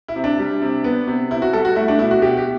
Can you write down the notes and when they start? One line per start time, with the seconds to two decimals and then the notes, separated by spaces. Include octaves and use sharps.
0.08 E4
0.16 C3
0.24 D4
0.39 G3
0.62 C3
0.84 B3
1.07 C3
1.31 C3 E4
1.42 F#4
1.53 G3 A4
1.65 F#4
1.76 A3 E4
1.88 D4
1.99 B2 E4
2.11 F#4
2.22 B2 G4
2.37 G4